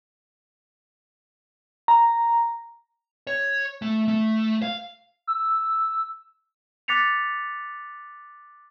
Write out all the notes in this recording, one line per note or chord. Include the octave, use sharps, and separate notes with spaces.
A#5
C#5
A3
A3
F5
E6
D6 F#6 A6 B6 C#7 F7